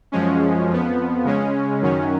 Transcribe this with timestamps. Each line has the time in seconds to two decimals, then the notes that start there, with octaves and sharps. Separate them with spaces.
0.12 F#2 F3 G#3 C#4
0.69 F2 F3 B3
1.24 C#3 G#3 C#4
1.82 F#2 D#3 F#3 C#4